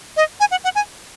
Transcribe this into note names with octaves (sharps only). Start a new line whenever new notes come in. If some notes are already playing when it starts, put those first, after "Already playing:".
D#5
G#5
F#5
F#5
G#5